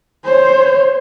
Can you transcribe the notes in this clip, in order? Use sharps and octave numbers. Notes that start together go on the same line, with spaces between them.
C5 C#5